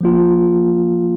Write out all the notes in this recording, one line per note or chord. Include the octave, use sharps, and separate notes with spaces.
F3 A#3 F4